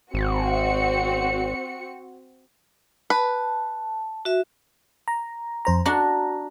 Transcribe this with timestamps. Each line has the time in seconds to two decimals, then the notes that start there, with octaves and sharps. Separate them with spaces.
0.14 G#1 C4 F#4 C#7
3.10 B4 A5
4.25 F#4 E5
5.08 A#5
5.65 F2 C5 A#5
5.86 D4 F#4 A#5